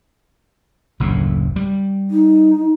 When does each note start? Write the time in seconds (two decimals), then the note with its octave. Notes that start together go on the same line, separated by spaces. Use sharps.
1.00 F#1 D2 A2
1.56 G3
2.10 D#4